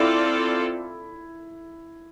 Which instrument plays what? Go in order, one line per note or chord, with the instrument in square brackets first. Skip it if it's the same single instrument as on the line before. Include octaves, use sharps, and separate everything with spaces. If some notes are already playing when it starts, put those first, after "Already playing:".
Already playing: [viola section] C4 F4 A4 D5 [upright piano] E4